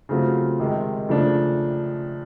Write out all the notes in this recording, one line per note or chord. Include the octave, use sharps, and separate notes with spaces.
C#3 F#3 A3 C4 F4
C3 D#3 G#3
C#3 F3 A3 D4